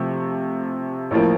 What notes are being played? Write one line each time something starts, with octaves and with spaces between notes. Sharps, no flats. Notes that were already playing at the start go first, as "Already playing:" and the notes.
Already playing: C3 F3 A3
A1 A2 F3 A#3